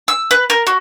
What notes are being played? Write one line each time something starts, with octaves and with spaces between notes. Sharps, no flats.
E6
B4
A#4
F#4